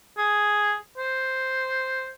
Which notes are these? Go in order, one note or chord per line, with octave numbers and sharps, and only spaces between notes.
G#4
C5